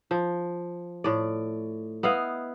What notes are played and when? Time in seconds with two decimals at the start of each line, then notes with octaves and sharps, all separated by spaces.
0.11 F3
1.04 A2 D5
2.03 B3 E4 D#5 F5